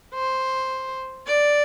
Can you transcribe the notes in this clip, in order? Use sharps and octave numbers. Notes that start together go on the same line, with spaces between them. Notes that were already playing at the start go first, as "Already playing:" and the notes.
C5
D5